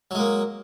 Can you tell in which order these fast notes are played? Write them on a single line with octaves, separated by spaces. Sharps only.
F#3 G#3 A#3